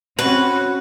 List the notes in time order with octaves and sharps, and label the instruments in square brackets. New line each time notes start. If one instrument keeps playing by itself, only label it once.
[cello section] C4 C#4 F#4 [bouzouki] B4